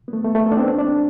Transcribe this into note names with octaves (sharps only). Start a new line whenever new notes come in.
B3
A3
A3
A3
B3
D4
C4
D4
D4